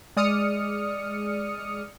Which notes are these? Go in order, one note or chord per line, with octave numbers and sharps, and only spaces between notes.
G#3 D5 D#6 F6 C#7